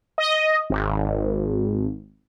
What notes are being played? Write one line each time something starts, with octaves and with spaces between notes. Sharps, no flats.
D#5
G#1